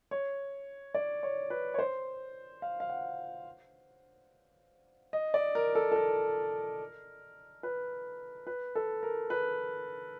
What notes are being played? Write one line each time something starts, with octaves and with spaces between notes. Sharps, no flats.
C#5
D5
C#5
B4
C#5
C5
F5
F5
F#5
D#5
D5
A#4
A4
A4
A#4
B4
B4
A4
A#4
B4